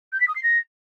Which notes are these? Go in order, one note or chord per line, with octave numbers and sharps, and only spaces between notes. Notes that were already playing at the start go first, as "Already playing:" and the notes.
G6
B6
D#6
C7
A#6